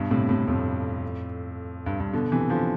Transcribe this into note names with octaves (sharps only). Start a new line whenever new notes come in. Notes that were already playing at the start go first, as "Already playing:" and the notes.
Already playing: G2 B2
A2 C3
A2 C3
F2 A2
G2
G2
B2 D3
C3 E3
D3 F3